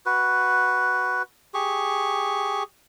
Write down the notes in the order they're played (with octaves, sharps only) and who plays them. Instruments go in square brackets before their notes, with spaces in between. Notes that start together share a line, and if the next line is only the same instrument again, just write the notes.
[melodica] F#4 B4
G4 G#4 C#6